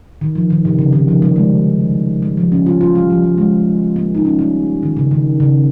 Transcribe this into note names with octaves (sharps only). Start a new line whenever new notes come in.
D#3
F3
D#3
C3
C#3
D#3
F3
G3
G#3
G3
F3
C#4
F4
F4
G3
F3
G3
G#3
A#3
D#4
C#4
G3
D#3
C#3
D#3
C#3